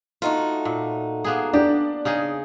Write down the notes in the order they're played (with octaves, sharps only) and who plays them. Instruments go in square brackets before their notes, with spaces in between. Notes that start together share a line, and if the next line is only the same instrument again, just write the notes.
[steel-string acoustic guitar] A3 D#4 F#4 [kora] F4
[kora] A#2
A#3 B3 G#4
[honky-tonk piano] D4 [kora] G4
[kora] C#3 D#4 G#4